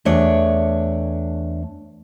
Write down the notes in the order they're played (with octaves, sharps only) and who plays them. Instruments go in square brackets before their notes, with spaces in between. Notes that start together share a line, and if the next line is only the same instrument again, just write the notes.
[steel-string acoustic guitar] E2 A3 D4 C#5